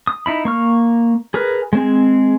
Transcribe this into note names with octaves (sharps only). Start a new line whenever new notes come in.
D#6
D#4 E4 B5
A#3 C#6 F6
G#4 A#4 B4
G#3 C4 G#4